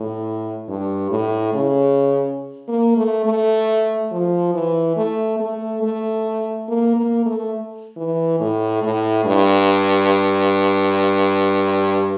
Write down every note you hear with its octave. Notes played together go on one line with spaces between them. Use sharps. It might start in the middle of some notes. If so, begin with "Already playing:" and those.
Already playing: A2
G2
A2
C#3
A#3
A3
A3
F3
E3
A3
A3
A3
A#3
A#3
A3
E3
A2
A2
G2